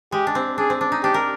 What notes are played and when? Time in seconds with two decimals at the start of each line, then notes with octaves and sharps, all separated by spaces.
0.12 G#3 G4
0.27 D4
0.35 C4
0.58 D4 G#4
0.70 C4
0.81 D4
0.92 D#4
1.03 D4 G4
1.14 A#4